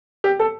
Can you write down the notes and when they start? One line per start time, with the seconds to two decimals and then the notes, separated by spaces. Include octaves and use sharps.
0.24 G4
0.39 A4